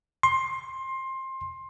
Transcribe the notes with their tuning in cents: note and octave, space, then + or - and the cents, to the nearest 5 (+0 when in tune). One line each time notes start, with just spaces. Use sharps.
C6 +20